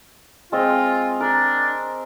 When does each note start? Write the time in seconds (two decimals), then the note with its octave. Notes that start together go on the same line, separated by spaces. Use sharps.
0.52 G#3 C4 F4 D#5
1.20 D4 A#4